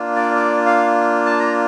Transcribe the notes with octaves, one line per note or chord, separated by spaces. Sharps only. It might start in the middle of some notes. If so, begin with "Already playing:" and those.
Already playing: A#3 D4 F4
D5
D5
F5
A5
A#5